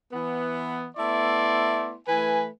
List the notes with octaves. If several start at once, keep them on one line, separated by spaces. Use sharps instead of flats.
E3 B3
A3 B3 E4 D5 C6
E3 A3 B4 G#5